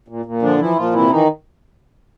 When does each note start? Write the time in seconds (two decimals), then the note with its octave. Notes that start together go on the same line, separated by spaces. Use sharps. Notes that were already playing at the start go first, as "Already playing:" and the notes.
0.08 A#2
0.25 A#2
0.42 D3 F3 D4
0.59 E3 F3 E4
0.76 A#2 F3 F4
0.93 C3 E3 E4
1.10 D#3 E3 D#4